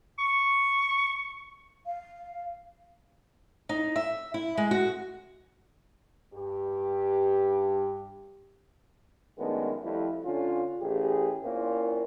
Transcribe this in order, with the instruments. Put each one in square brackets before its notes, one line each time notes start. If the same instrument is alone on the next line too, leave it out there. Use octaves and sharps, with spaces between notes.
[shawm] C#6
[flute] F5
[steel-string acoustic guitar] D#4
E5
E4
G#3
F#4
[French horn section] G2 G4
[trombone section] F#2 D#3 G#3 A3 B3 D4
F2 F3 G3 A3 E4
D3 C#4 F4
A1 G4 G#4
A#2 A#3 C4 C#4 E4 F4